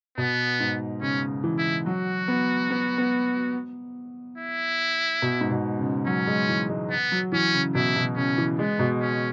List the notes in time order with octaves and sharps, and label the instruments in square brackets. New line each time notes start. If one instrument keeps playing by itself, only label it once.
[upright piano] B2 [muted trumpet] B3
[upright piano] G#2
[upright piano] C#3 [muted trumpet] C#4
[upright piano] E3
[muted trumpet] E4
[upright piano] F#3 [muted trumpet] F#4
[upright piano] B3
B3
B3
[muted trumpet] E4
[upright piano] B2
G#2
B2
C#3
[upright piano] F#3 [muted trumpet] C#4
[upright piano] G#3
E3
G#3
[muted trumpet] B3
[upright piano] F#3
[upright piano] E3 [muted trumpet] C#4
[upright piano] C#3
[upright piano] B2 [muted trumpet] E4
[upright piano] B2
[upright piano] C#3 [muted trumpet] C#4
[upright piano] E3
[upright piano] G#3 [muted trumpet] B3
[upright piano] B2
[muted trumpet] C#4